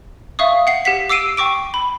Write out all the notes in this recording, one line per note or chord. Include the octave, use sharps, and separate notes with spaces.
E5 F5 C#6 D#6
F#5 C7
G4 F#5 B6
D6 E6 C7 D7 D#7
G5 C#6 D6 D7
B5